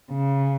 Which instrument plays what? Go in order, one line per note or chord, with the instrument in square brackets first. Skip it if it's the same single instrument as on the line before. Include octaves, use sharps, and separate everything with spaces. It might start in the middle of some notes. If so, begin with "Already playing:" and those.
[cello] C#3